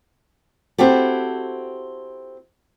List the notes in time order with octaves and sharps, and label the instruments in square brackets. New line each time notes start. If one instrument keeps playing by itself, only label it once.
[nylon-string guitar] C4 E4 F#4 G4 A4